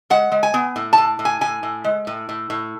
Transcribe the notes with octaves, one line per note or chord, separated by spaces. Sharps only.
G#3 F#5
G#3
G#5
B3
A2
A5
A2
A2
G#5
A2 G#5
A2
G#3
A2
A2
A2